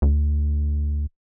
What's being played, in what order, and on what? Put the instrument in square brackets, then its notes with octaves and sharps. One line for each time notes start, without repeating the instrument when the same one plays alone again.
[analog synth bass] D2